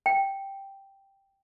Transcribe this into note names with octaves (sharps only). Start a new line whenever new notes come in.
G5